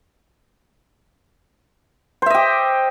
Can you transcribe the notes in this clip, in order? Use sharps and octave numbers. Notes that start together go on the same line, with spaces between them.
G4 C5 D#5 E5